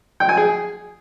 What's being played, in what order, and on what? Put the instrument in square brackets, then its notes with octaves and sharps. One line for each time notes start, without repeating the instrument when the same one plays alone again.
[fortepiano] G5
G#5
G#4